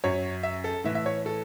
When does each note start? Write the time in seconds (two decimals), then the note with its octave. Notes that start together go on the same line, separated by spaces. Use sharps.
0.04 F#2 F#3 C#5
0.43 E5
0.64 A4
0.84 A2 E3 E5
0.95 E5
1.06 C#5
1.26 A4